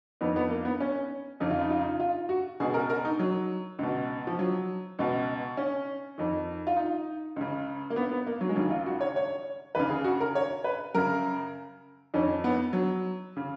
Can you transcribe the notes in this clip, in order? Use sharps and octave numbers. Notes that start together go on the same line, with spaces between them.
F2 D#3 B3
B3
A#3
B3
C#4
F2 C#3 D#4
F4
D#4
F4
D#4
F4
F#4
C#2 B2 G#4
A#4
A#4
D#4
F#3
C#2 B2
F3
F#3
C#2 B2
C#4
F2 D#3
F4
D#4
C#2 C#3
A#3
B3
B3
A#3
F#3
G#3
D#2 C#3 F#3
F4
F#4
C#5
C#5
D#2 C#3 B4
G#4
F#4
A#4
C#5
B4
F#2 C#3 A#4
F2 D#3 C#4
B3
F#3
C#3